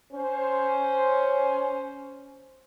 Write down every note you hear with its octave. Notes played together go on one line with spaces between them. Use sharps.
C#4 C5